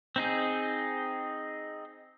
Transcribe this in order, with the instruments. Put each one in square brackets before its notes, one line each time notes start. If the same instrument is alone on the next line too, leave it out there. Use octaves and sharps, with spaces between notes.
[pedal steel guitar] C4 D#4 G#4